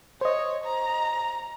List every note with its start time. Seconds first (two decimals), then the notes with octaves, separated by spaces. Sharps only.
0.21 C5 C#5 D#5
0.64 A#5